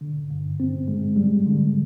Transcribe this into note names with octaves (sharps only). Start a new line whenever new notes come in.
D3
G2
C4
G#3
G3
D3